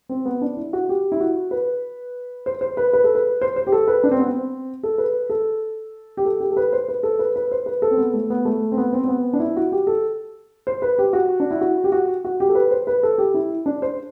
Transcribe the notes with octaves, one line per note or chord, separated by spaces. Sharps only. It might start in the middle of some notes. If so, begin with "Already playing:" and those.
C4
B3
D4
E4
F#4
G4
E4
F#4
B4
C5
C5
B4
B4
A4
B4
C5
C5
G4
A4
B4
D4
C4
B3
C4
A4
B4
A4
G4
A4
G4
A4
B4
C5
B4
A4
B4
B4
C5
B4
A4
C4
B3
A3
B3
A3
C4
B3
C4
C4
B3
D4
E4
F#4
G4
A4
C5
B4
G4
F#4
D4
E4
F#4
G4
F#4
F#4
G4
A4
B4
C5
B4
A4
G4
E4
D4
C5